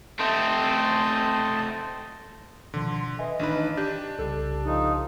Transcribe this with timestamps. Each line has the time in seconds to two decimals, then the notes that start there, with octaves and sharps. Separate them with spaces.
0.19 A3 C4 C5 D#5 A5
2.74 B2 D3 D#3 F3 C6
3.19 B4 D#5 E5 G#5
3.40 A1 D#3 D4 D#4 B4
3.77 D4 G4 G6
4.19 C2 C#3 G4 A4
4.65 F3 D#4